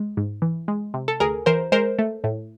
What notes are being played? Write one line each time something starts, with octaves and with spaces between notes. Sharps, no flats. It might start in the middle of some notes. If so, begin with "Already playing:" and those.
Already playing: G#3
G#2
E3
G#3
C3
A4
D2 G#4 A#4
E3 A#4 C5
G#3 A#4 C5
A3
A2